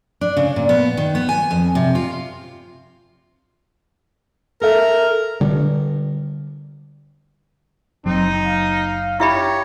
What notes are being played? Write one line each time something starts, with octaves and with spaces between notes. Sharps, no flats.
D4
C#3
A#2
B3
D#3
B3
G#5
F2
C3
F4
A4 A#4 E5
D3 G3
F#1 F#3 C4 D#4
F5
E4 G4 C#5 E5 B5